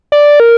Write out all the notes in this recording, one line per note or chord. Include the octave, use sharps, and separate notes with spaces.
D5
A#4